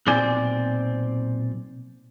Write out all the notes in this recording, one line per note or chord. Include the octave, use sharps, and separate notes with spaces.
B1 A#2 C4 C5 D5 G#5